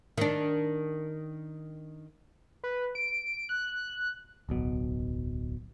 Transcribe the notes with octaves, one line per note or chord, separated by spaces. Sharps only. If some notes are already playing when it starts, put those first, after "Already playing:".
D#3 D4
B4
D7
F#6
D1 B1 B2